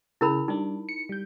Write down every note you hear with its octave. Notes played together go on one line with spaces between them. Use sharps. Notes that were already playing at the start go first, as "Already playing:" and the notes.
C#3 E4 G#4 A#4 B5
G3 D4 D#4
C#7
G3 G6